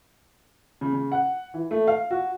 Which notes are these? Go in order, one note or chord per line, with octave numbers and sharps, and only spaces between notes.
C#3
C#3
F#5
E3
A3
F5
F#4